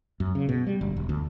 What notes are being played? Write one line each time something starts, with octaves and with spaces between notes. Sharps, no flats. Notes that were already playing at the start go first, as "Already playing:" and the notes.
F#2
C#3
B2
G3
G1
E1
D2